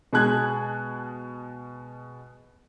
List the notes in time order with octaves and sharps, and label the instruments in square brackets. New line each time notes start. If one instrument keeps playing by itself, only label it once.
[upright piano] B2 G#3 A5 F#6 G#6